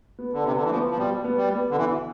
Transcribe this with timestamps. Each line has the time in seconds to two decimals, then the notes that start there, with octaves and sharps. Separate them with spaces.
0.19 B3
0.33 D3
0.44 C3 B3
0.56 D3
0.63 E3
0.71 F3 B3
0.90 F3
0.98 B2 G3
1.24 B3
1.37 G3
1.51 B3
1.70 D3
1.76 B2 E3